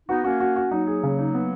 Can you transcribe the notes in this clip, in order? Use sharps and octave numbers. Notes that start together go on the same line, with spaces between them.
B3 D#4 F#4
A#3 C#4 F#4
F#4
F#4
F#3 A#3 D#4
G#4
C#3
D#4
B3